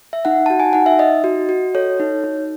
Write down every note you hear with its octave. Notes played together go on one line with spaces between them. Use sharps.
E5
D#4 F#5
F#4 A5
G#5
D#4 F#5
E5
D#4 D#5
F#4
F#4
A4 C#5
D#4
D#4